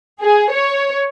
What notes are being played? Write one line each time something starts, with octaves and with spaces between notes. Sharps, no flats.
G#4
C#5